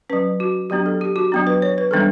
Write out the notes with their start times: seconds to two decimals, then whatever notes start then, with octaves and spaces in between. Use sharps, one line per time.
0.10 F#3 C#4 B4
0.40 F#4
0.70 F#3 B3 D4 G4
0.86 A4
1.01 G4
1.16 F#4
1.32 F#3 B3 D4
1.47 B4
1.62 C#5
1.78 B4
1.91 E3 G3 B3 D4 A4